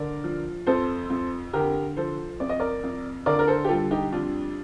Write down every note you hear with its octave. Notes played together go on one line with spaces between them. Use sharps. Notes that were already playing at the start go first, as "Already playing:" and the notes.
Already playing: D3 A#4 D5
F3
F2 A4 C5
F2
D3 G4 A#4
F3 A4 C5
F2 D5
D#5
A#4 D5
F2
D3 A#4 D5
A#4
A4 C5
G4
G3 F4 A4
D#4 G4
F2 D4 F4